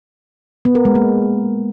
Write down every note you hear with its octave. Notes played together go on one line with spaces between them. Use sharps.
B3
A#4
G#3
A#3